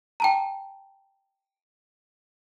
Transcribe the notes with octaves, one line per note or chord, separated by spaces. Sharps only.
G5 A5 A#5